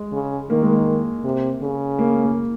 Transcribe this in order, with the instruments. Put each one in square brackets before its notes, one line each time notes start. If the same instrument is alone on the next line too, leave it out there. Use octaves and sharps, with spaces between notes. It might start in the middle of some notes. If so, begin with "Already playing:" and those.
Already playing: [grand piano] G#3
[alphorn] C#3
[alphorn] D#3 [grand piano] A#3
[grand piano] G#3
A#3
[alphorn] C3
C#3
[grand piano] A#3
A#3